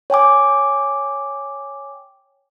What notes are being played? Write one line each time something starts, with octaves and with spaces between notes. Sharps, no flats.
C#5 G5 G#5 D6